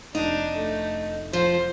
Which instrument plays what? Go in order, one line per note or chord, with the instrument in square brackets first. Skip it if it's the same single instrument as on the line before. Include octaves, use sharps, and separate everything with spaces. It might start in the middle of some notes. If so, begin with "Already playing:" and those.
[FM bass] F1 [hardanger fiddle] D4 [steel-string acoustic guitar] D#4
[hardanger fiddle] A3
[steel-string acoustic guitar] F3 [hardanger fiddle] C5